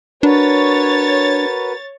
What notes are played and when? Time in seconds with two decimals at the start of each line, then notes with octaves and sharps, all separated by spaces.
0.23 D4 F#4 A#4 B4 C#5 A6